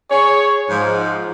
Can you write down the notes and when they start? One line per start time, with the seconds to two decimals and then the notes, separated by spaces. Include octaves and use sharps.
0.11 G#4 C#5
0.70 G#2 F3